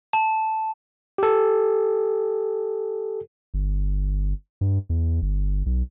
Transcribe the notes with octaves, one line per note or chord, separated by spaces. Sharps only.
A5
G4 A4
G1
G2
E2
G1
B1